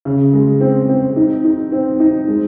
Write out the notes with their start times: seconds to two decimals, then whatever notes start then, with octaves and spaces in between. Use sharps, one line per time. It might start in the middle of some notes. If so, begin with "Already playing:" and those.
0.05 C#3
0.33 G#3
0.61 C4
0.89 C4
1.16 D#4
1.45 D#4
1.72 C4
2.00 D#4
2.28 G#3